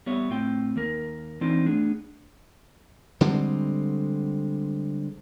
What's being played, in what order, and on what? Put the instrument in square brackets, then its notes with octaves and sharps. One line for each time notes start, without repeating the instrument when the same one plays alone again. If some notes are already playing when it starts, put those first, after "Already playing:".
[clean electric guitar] G3 B3 C#5 E5
A2 C4 F4 G5
D#2 A#3 A#4
E3 C4 D4 D#4 F4
A3 B3 D4 G#4
[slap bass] D3 G3 G#3 C4